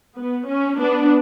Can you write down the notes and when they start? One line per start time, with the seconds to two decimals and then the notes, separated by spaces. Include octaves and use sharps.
0.18 B3
0.49 C#4
0.80 B3 D4